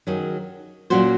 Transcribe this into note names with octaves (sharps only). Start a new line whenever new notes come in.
D#3 F#3 C#4 G#4
A#2 F#3 C#4 F#4 C5